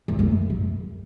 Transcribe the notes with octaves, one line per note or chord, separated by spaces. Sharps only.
E2
F#2
F#2